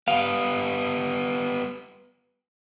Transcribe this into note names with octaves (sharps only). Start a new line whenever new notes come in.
G3 B3 F5